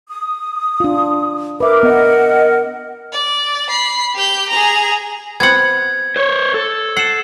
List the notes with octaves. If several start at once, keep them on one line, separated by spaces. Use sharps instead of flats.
D#6
D4 F4
A#4 B4 E5 D6
B3 D#5 F#5
D5
B5 C7
G4 G6
G#4 A#5
B3 C4 F#5 G#6
C5 C#5
A4
F#5 C7 E7